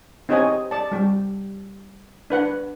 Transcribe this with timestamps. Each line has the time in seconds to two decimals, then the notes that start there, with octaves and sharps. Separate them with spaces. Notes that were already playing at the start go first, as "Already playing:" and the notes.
0.29 C4 D#4 G4 C#5 D#5 G#5
0.71 D5 A5
0.92 G3 G4
2.30 D4 B4 F#5